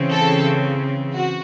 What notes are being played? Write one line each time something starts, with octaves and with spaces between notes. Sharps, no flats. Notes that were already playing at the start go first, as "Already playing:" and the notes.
Already playing: C#3 E3 C4
A4
F#4